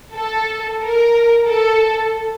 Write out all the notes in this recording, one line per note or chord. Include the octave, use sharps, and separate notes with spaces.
A4
A#4
A4